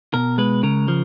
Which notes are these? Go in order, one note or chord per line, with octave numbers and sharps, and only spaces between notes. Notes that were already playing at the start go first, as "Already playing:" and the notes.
B2 A#4
G#3 B4
C#3 A#4
F3